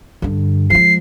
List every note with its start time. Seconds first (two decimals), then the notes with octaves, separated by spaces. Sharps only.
0.22 G2 D3
0.70 F3 G#3 C7